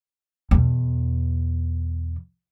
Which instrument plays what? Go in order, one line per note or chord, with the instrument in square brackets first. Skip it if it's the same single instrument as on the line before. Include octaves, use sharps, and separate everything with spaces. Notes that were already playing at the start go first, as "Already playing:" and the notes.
[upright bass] E2 B2